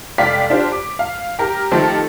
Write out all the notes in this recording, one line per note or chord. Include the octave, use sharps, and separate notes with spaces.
F1 D5 F5 G5 B6
D4 F4 G4 C5
D6
F5
G4 A#4
D#3 F3 A3 C4 G4 A4